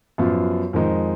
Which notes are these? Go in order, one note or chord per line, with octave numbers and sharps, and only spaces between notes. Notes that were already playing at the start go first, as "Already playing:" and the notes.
F#2 F3 B3 F4
F2 D#3 G#3 D#4